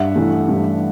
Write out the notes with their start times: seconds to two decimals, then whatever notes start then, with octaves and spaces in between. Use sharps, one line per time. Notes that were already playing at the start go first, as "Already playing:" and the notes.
Already playing: G2 E5 F#5
0.16 E3 A3
0.48 G2